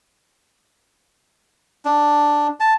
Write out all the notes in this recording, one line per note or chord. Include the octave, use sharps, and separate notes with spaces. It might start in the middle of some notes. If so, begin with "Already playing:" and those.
D4
A5